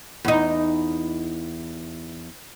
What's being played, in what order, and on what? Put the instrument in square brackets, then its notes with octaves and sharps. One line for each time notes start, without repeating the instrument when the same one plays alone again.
[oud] E2 D#4